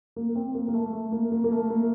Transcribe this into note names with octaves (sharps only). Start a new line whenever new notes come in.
A#3
C4
A#3
A#3
A3
A3
A#3
A#3
A#3
A3
A#3